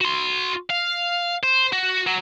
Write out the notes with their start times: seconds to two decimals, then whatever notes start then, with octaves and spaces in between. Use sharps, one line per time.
0.01 F#4 C6
0.70 F5
1.43 C5
1.73 F#4
2.07 F#3